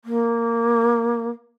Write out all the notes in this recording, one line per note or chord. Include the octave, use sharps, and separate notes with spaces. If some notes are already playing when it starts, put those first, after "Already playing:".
A#3